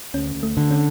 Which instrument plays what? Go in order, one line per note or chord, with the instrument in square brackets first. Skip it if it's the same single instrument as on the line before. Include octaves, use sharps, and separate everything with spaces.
[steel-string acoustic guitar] D2 [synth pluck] C#4
[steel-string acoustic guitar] D2
[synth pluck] A3
[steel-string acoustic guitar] D3
[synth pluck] C#4